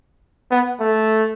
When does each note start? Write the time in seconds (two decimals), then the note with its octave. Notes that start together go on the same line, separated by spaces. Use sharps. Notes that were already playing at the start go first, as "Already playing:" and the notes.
0.51 B3
0.80 A3